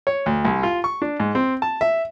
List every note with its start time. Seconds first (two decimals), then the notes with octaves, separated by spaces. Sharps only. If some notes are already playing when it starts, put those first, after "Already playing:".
0.07 C#5
0.26 D2
0.45 C2
0.63 F4
0.84 C#6
1.02 D4
1.20 G#2
1.35 C4
1.62 A5
1.81 E5